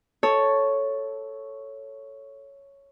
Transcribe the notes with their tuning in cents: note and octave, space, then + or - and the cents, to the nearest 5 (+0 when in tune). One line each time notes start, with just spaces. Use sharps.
A4 +0 C#5 +0